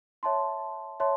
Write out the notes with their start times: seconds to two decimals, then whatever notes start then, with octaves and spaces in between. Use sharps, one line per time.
0.23 C#5 E5 A5 C6
1.00 C#5 E5 A5 C6